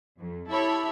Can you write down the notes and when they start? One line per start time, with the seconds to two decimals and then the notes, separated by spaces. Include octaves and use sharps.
0.17 F2
0.51 E4 G4 A4 C#5 E5 B5